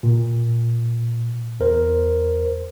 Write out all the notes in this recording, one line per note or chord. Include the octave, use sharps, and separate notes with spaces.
A#2
E2 A#4 C5